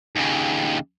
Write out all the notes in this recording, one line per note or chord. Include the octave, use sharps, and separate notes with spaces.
D#2 C#3